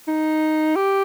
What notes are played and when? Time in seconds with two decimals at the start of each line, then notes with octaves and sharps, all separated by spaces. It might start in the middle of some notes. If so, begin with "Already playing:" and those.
0.08 D#4
0.76 G4